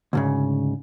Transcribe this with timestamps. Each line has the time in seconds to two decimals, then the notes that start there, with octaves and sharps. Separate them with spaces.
0.13 D2 G#2 C#3